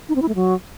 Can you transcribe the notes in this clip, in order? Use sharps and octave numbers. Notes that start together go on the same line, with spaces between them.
D#4
C4
E4
A3
F#3